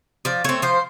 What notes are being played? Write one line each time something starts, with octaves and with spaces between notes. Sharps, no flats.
F3 D5
A3 C4 C#5
F3 C5